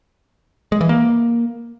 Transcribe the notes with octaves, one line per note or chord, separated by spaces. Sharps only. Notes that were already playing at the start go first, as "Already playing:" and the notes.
G#3
E3
A#3